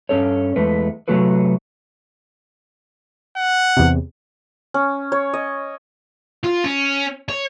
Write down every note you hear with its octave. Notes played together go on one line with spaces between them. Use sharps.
G2 C#4 A4 C#5
E2 G#3 A3 B4
C3 F#3 A3 F#4 A4 B4
F#5
E2 C3
C#4
C#5
D#5
F4
C#4
C#5